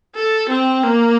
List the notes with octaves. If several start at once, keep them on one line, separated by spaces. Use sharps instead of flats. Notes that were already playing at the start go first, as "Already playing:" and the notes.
A4
C4
A#3